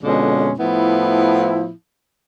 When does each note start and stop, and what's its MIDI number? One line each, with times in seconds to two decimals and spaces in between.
0.03 0.51 41
0.03 0.51 47
0.03 0.51 50
0.03 0.51 56
0.03 0.51 61
0.59 1.71 45
0.59 1.71 53
0.59 1.71 59
0.59 1.71 64